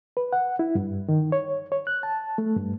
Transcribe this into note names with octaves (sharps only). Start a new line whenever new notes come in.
B4
F#5
E4
G2
D#3
C#5
C#5
F#6
A5
A3
G2